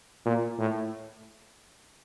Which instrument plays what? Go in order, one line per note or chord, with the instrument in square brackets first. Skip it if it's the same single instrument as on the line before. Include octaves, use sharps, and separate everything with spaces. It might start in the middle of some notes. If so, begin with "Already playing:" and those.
[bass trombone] A#2
A2